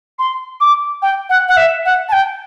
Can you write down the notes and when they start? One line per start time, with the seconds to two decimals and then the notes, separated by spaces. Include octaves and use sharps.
0.18 C6
0.60 D6
1.02 G5
1.29 F#5
1.48 F#5
1.57 E5
1.85 F#5
2.08 A5
2.12 G5